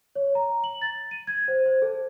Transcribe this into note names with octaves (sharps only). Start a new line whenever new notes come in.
C#5
A#5
F#7
A6
D#7
G#6
C5
C5
A4